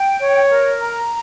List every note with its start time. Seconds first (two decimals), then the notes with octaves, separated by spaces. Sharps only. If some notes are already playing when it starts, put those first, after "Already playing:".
Already playing: G5
0.19 C#5
0.50 A#4
0.80 A#5